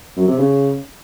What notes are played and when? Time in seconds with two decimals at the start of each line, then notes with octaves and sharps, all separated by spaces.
0.17 F#2
0.28 C3
0.38 C#3